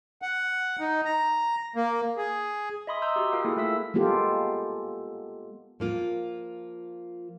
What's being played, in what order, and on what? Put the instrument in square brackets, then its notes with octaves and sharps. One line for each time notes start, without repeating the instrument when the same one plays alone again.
[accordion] F#5
D#4
A#5
A#3
G#4
[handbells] D#5 E5 B5 C6 D#6
A#5 C6 D#6 E6 G6
F#4 G4
F4 A#4 F5 G5
A#3 E4 G#4 A4
A3 F4 E5 E6
[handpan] G#3 A#3 B3 F4 G4 A4
[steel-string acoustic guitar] F3 A#3 F4